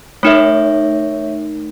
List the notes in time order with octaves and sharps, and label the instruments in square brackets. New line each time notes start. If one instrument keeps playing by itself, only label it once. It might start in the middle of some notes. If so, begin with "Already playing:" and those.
[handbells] A3 D#4 A#4 [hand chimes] C#5 E5